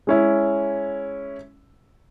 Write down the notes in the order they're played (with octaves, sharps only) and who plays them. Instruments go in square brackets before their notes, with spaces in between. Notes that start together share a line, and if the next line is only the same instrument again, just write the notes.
[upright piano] G#3 C#4 E4